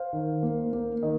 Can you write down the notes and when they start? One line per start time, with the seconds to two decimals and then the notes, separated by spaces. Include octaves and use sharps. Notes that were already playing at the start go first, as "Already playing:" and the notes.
Already playing: C5 F5
0.13 D#3
0.43 A#3
0.73 A#3
1.03 D#3 D#5